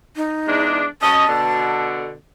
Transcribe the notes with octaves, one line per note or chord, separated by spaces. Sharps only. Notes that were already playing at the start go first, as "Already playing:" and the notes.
D#4
E2 G#3 D4
C#4 F#4 D#5 A5
B2 D3